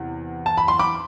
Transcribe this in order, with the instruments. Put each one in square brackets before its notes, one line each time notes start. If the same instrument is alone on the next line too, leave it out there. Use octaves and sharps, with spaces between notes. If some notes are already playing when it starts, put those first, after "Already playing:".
Already playing: [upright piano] E2 C3
A5
B5
C6
B5 D6